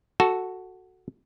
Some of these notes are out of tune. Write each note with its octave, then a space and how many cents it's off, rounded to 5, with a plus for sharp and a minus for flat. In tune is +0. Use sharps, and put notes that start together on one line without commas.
F#4 +0 A4 +0 A5 +0